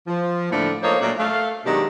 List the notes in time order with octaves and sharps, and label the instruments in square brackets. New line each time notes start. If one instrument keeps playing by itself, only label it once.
[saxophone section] F3
A2 D3 F3 A3 A#3 D4
F3 A3 A#3 D#4 C5 C#5
A#2 F#3 A3 D4
A3 F5
B2 D#3 F#3 G#3 D4 G4